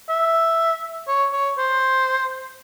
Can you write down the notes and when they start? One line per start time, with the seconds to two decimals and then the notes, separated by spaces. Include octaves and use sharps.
0.09 E5
1.08 C#5
1.33 C#5
1.58 C5